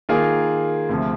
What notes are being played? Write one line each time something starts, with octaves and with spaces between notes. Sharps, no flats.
D#3 A#3 F4 G#4
D2 C3 F3